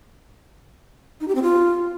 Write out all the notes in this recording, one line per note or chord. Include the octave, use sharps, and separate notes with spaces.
D#4
G4
C4
F4